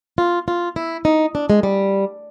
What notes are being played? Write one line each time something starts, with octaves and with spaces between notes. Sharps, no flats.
F4
F4
E4
D#4
D4
G#3
G3